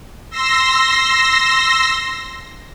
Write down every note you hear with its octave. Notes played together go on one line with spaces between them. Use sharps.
C6 E6 A#6